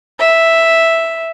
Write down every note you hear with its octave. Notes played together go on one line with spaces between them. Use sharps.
E5